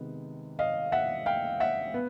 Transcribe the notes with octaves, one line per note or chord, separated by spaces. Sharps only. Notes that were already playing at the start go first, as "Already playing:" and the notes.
Already playing: C3 D#3 G#3 B3
D#5 F5
E5 F#5
F5 G5
E5 F#5
B3